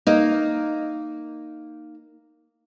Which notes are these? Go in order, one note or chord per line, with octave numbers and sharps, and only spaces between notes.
A#3 D#4